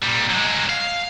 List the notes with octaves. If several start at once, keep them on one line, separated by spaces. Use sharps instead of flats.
A#2 G3
F#3 G#3
F5